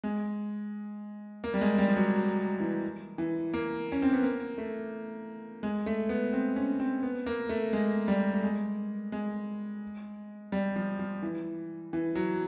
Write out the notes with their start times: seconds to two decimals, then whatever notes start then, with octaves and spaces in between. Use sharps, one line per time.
0.04 G#3
1.44 A#3
1.54 G3
1.61 G#3
1.78 G3
1.88 F3
1.96 F#3
2.60 E3
3.18 E3
3.53 A#3
3.92 C#4
4.02 C4
4.13 B3
4.23 A#3
4.58 A3
5.63 G#3
5.86 A3
6.09 B3
6.33 C4
6.56 C#4
6.80 C4
7.03 B3
7.26 A#3
7.49 A3
7.73 G#3
8.08 G3
8.33 A3
8.43 G#3
9.12 G#3
10.52 G3
10.76 F3
10.99 F3
11.22 E3
11.93 E3
12.15 F#3